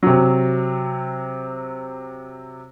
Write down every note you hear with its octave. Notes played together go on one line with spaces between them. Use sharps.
C3 F#3